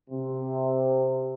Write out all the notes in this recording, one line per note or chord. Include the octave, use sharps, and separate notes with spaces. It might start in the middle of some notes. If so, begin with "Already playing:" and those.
C3